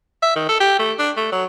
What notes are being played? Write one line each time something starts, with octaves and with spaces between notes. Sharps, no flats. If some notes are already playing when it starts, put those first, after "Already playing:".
E5
D#3
A4
G4
A3
D4
A3
F#3